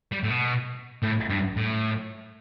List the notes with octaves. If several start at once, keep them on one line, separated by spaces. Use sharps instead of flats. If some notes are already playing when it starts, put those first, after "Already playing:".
G3
A2
B2
A2
G2
A2